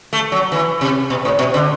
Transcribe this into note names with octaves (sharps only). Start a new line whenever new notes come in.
A3
F#3
E3
C3
B2
A2
B2
D3